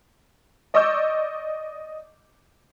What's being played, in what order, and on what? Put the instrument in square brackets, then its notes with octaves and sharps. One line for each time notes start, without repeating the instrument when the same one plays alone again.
[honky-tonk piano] D5 D#5 C#6 D6 E6 G6